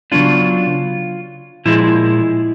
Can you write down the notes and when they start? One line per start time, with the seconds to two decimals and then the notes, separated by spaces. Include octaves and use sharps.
0.12 C#3 F#3 B3 D4 F4
1.65 A#2 F3 G#3 E4